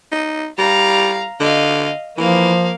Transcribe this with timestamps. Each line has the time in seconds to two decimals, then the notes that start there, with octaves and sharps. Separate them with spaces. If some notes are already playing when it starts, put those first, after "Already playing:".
0.12 D#4
0.58 G3 F5 A#5
1.40 D3 D#5 F5
2.18 E3 F3 A#3 F5